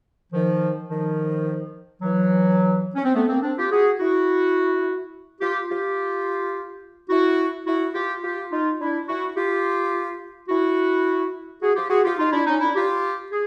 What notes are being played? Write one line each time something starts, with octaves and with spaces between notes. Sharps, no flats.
D#3 F3
D#3 F3
E3 F#3
C#4
C4
A3 B3
A#3 C4
C4 D4
F4 G4
F#4 G#4
E4 F#4
F4 G4
F4 G4
E4 F#4
E4 F#4
F4 G4
F4 G4
D#4 F4
D4 E4
E4 F#4
F4 G4
E4 F#4
F#4 G#4
F4 G4
F#4 G#4
F4 G4
D#4 F4
D4 E4
C#4 D#4
D4 E4
F4 G4
G#4